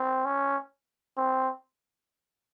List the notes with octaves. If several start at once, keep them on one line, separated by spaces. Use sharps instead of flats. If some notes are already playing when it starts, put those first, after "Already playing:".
Already playing: C4
C#4
C4